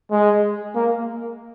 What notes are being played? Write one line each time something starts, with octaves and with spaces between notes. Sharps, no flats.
G#3
A#3